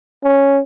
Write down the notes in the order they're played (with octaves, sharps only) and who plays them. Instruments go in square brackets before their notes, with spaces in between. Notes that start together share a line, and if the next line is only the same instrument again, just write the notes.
[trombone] C#4